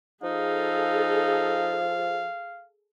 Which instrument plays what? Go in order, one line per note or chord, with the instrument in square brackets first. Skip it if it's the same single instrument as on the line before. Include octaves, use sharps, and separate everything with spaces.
[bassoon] F3 [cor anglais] D#4 [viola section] G#4 A4 [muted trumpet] F5